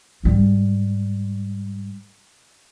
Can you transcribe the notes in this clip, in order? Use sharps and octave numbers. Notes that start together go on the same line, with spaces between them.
G#2 G3